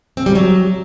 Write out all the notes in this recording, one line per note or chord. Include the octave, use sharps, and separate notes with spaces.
C4
G3
F#3